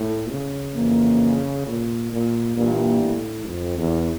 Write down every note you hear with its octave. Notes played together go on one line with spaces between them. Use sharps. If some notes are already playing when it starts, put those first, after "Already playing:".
Already playing: A2
C#3
F2 E3 A#3
A#2
A#2
G2 A#2 E3 A#3 D4 G4
A2
F2
E2